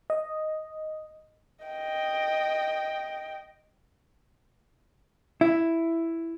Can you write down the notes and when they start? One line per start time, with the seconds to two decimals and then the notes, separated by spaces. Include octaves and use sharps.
0.10 D#5
1.65 D#5 G5
5.41 E4